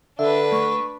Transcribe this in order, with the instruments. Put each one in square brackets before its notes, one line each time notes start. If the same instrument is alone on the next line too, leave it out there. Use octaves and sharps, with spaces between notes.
[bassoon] D3 [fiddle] D4 B4 [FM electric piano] E5
[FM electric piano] A3 [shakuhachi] C#6